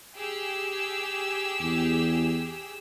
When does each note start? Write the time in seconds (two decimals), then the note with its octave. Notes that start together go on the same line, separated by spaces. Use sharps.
0.16 G4 G#4 E6
1.60 E2